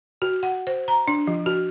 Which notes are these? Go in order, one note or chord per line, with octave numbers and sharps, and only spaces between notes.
F#4
F#5
C5
A#5
D4
F3
F#4